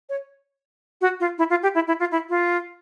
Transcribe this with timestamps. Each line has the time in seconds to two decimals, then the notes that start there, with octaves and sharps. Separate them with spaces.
0.09 C#5
1.01 F#4
1.20 F4
1.38 E4
1.50 F4
1.63 G4
1.75 E4
1.88 E4
2.00 F4
2.12 E4
2.30 F4